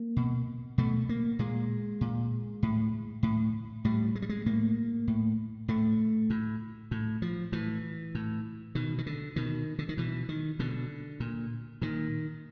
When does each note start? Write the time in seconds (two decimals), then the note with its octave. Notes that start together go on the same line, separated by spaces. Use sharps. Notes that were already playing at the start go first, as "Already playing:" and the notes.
Already playing: A#3
0.17 B2
0.78 B2 A3
1.09 A#3
1.39 A#2 G#3
2.01 A#2
2.63 A2
3.23 A2
3.85 A2 G3
4.15 G#3
4.22 G3
4.29 G#3
4.46 A2 A#3
5.08 A2
5.68 A2 A3
6.30 A2
6.91 A2
7.22 F3
7.52 A2 E3
8.15 A2
8.75 B2 D#3
8.98 D#3
9.06 D3
9.36 B2 D#3
9.79 D3
9.89 D#3
9.98 B2 E3
10.29 D#3
10.59 B2 D3
11.20 A#2
11.82 A#2 D#3